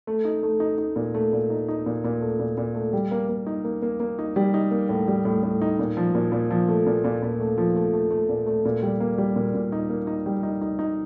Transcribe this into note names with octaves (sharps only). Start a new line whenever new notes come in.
A3
D#4
A3
D#4
D#4
A#2
A3
A#2
D#4
D#4
A#2
A#2
A3
A#2
A#2
A3
G3
A#3
A#3
D#4
A#3
A#3
A#3
D#4
G3
D#4
A#3
A2
G3
A2
A2
D#4
A#2
F3
A#2
A#2
F3
A3
A#2
A#2
A#2
A3
F3
A3
A3
A3
A#2
A3
A#2
G3
A#3
G3
A#2
A#2
D#4
A#3
D#4
G3
D#4
D#4
D#4